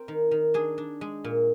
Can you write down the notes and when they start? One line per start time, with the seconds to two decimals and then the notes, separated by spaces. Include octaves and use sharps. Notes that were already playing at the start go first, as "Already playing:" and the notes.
Already playing: C4 A#4
0.08 D#3
0.31 D#3
0.54 D4 G#4
0.78 D4
1.01 G#3
1.24 A#2